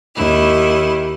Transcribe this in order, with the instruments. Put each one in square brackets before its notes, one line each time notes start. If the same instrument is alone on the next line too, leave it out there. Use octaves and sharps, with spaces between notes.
[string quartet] D#2 E4